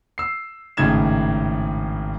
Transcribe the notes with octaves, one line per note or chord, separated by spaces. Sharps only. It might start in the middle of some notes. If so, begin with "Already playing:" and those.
E6 C7
G#1 A2 C#3 D#4 G#6 E7